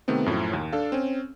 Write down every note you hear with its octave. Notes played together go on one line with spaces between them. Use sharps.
C3 D#3 A3 B3 C4
F#2 A2 F3
D#2
D4 A4 F5
C4 C#4